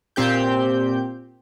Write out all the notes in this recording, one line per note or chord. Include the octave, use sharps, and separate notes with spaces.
A#2 C4 G4 G6